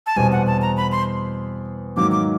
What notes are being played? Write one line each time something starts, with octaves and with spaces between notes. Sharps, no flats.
A5
E2 B2 G3 C4 G#5
F#5
A5
A#5
B5
C6
G#2 D#3 F#3 A#3 D6
D6